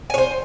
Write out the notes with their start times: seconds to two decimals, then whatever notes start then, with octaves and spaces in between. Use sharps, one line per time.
0.10 G#5
0.14 C#5
0.18 C5